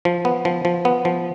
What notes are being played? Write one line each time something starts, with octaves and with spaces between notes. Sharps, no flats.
F3
B3
F3
F3
B3
F3